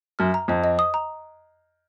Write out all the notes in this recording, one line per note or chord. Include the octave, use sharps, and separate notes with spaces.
F#2 F6
A#5
F2 D#5
D#5
D#6
A#5